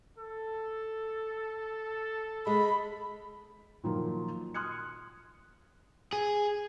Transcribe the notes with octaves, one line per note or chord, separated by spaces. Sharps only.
A4
G#3 B5
A#2 D#3 F3 F#3 A#3
C6 D#6 F6 F#6 G#6 C#7
G#4